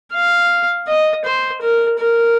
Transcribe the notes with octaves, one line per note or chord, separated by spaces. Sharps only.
F5
D#5
C5
A#4
A#4